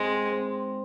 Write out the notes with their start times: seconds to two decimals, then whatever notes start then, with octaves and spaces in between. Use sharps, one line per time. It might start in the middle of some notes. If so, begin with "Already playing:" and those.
Already playing: G#2 G#3 C4
0.32 C4